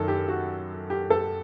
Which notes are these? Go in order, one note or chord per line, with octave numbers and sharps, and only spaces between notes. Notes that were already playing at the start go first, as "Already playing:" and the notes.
Already playing: F#2 D#3 A4
G4
F#4
G4
A4